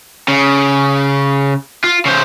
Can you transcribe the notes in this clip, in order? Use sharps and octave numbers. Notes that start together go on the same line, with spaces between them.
C#3
F4
C#3 C5